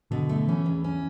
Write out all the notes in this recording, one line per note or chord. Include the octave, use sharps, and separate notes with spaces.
B2 D3
A3
E3 C#4
E2
C#4